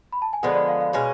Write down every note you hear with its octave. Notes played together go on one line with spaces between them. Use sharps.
B5
A5
G#5
D3 F3 G#3 B3 F#5
D5
F5
F5
B2 G#3 C#4